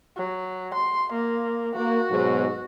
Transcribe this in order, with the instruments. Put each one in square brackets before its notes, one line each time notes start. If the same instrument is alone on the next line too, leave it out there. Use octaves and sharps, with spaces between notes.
[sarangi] F#3
C6
A#3
[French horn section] A#3 [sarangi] F#4
[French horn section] G#2 B2 F#3